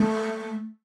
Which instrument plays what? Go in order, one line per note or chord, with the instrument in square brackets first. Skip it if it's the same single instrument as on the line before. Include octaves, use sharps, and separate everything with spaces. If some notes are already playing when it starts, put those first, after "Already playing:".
Already playing: [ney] A3